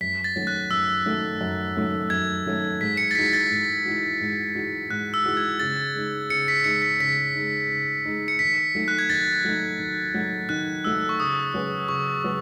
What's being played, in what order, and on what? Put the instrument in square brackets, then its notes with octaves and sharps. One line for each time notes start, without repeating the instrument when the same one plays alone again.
[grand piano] F#2 [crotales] B6
[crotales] A6
[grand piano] D#3 F#3 A3 C#4
[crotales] F#6
[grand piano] F#2 [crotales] E6
[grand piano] D#3 F#3 A3 C#4
F#2
D#3 F#3 A3 C#4
[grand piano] F#2 [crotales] G#6
[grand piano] D#3 F#3 A3 C#4
[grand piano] G#2 [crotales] B6
[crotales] C#7
A6
[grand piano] E3 G#3 D#4 F#4 [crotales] B6
[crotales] A6
[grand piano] G#2
E3 G#3 D#4 F#4
G#2
E3 G#3 D#4 F#4
[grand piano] G#2 [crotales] F#6
[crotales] E6
[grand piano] E3 G#3 D#4 F#4
[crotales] G#6
[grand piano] C#3 [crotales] A6
[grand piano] G#3 D#4
[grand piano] C#3 [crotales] C#7
[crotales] B6
[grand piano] G#3 D#4 [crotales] C#7
[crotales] B6
[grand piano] C#3 [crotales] B6
[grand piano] G#3 D#4
C#3
G#3 D#4
[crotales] C#7
[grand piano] D#3 [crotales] B6
[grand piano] F#3 A3 D#4
[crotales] F#6
G#6
[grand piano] D#3 [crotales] A6
[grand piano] F#3 A3 D#4
D#3
F#3 A3 D#4
[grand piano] D#3 [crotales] F#6
[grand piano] F#3 A3 D#4 [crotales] E6
[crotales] C#6
[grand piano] C#3 [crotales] D#6
[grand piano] F#3 C#4 G#4 B4
[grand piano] C#3 [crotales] C#6
[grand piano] F#3 C#4 G#4 B4